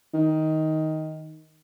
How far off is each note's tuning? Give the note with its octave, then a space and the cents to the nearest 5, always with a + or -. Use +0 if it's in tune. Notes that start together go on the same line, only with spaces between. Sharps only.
D#3 +10